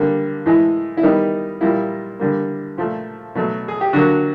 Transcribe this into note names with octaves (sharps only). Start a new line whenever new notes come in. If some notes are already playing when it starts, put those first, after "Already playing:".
Already playing: D3 G3 A#3
A2 E3 G#3
E4
D#3 G3 B3 D#4
A#2 G3 A#3 E4
D3 G3 A#3
A#2 F3 A3
B2 F#3 A3
G#4
G4
D3 F#3 A#3 F#4